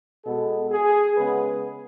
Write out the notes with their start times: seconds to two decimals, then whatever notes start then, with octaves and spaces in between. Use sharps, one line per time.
0.24 B2 G#3 B3 A4
0.70 G#4
1.17 C#3 G#3 B3 B4